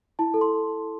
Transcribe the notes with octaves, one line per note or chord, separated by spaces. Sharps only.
E4 A5
A4
C6